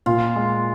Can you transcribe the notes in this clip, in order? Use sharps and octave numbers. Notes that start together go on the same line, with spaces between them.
A#2 F4
G#3